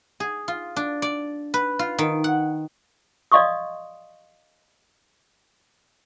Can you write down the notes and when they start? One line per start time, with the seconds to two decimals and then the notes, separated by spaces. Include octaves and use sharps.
0.20 G#4
0.48 F4
0.76 D4
1.02 D5
1.54 B4
1.79 F4
1.98 D#3
2.24 F#5
3.32 D5 D#5 F5 C6 C#6 D#6